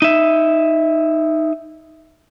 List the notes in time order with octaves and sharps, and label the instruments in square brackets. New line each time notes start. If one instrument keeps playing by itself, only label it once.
[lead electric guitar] D#4 E5